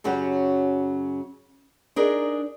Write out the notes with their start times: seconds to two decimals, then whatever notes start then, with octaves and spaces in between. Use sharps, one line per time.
0.04 F#2 C#3 F#3 C#4 F#4 G4
1.96 D4 D#4 G#4 A#4 D#5